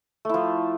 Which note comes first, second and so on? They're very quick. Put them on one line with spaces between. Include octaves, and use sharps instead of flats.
A3 E4 F3